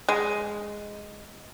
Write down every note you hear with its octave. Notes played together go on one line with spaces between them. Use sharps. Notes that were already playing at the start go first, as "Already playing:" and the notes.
G#3